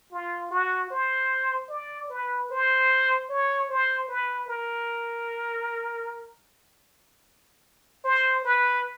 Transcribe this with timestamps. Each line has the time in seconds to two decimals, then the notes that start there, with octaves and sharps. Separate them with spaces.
0.12 F4
0.51 F#4
0.91 C5
1.70 D5
2.10 B4
2.51 C5
3.30 C#5
3.69 C5
4.09 B4
4.48 A#4
8.05 C5
8.45 B4